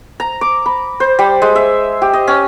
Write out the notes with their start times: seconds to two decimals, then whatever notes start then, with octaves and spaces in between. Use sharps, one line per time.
0.20 A#5
0.41 D6
0.66 B5
1.00 C5
1.19 G3
1.42 G#3
1.56 E5
2.02 G4
2.13 D#5
2.27 C#4